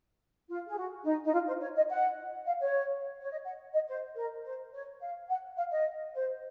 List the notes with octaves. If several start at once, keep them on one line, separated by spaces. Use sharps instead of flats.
F4
G#4
F#4
D#4
D#4
F4
C5
C#5
D#5
F#5
F5
C#5
C#5
D#5
F#5
D#5
C5
A#4
C5
C#5
F5
F#5
F5
D#5
C5